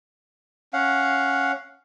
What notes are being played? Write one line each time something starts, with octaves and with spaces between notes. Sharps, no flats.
C#4 F5 F#5